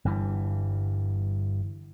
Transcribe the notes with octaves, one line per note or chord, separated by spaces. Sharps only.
G1 G2 E3